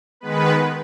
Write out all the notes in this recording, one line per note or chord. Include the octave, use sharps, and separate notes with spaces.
D#3 G#3 B3 B4